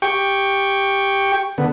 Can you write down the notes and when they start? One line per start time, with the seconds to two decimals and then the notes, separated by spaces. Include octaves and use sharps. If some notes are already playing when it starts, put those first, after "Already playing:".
0.02 G4 G5 C#6
1.58 D3 B3